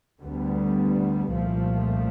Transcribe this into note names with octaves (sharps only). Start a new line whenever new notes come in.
D2 D3 G3 B3
C2 A#2 F3 A3